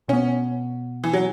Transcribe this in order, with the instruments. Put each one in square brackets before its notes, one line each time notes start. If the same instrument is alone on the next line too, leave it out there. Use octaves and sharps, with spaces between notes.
[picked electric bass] B2 B3 [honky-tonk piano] C#4
[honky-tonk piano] E3
F#3